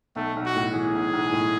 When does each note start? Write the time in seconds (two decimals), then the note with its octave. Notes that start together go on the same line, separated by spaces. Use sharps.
0.16 B1 A3
0.36 B1
0.46 F#4
0.55 A2
0.74 E3 G#4
0.94 B1
1.13 B1
1.32 A2